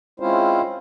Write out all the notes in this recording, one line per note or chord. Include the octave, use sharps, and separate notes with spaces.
G#3 C4 C#4 E4 F4 C5